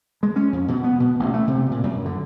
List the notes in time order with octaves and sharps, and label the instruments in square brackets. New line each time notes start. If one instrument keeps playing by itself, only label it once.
[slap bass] G#3
C#4
F2
B2
B3
B2
A1
A3
C3
A#2
F#2
D3